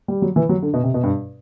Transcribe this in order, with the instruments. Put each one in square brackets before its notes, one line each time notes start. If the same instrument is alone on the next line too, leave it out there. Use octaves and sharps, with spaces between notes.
[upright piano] G3
F#3
E3
F#3
D3
B2
C3
B2
G2